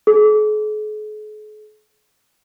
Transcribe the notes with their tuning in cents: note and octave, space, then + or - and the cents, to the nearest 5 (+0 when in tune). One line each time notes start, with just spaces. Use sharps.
G#4 +45